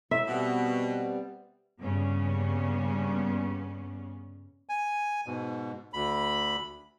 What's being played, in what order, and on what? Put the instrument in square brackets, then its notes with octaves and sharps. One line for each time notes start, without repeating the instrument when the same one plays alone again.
[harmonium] A2 [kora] E5
[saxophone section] B2 [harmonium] G3 B3 C4
[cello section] G2 C#3 A#3 B3 C#4
[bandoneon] G#5
G#2 B2
D2 B5